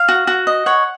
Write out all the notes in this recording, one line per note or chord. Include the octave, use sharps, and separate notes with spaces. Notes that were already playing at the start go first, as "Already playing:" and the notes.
Already playing: F5
F#4
F#4
D#5
C#5 F#5